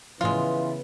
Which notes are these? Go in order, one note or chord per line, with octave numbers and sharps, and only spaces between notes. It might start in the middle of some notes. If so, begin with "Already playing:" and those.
A2 C#3 E3 F3 G#3 B3 F4